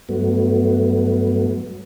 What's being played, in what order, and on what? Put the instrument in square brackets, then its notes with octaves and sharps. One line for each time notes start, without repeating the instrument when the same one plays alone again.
[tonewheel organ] G2 F#3 A3 B3